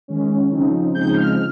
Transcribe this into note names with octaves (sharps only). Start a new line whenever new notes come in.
D#3 G#3 C#4
C#3 F3 C4 D#4
C#3 F3 G#3 C4 D#4 G6
F6